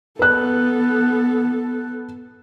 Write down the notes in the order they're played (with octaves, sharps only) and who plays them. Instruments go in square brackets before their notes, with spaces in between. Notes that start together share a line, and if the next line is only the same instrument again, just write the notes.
[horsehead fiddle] B3 A4 [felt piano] B4 F#6